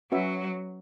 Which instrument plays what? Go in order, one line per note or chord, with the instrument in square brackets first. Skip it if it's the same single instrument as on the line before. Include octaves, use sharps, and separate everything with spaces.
[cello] F#3 [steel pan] C#4 F#4 B4 E5